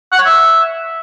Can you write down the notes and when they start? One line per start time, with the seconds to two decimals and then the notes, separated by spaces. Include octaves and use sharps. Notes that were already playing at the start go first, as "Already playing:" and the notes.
0.12 F#5
0.19 C#5
0.25 E5